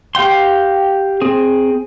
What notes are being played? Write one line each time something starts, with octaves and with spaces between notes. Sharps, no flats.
G4 F5 G5 C6
C4 G#4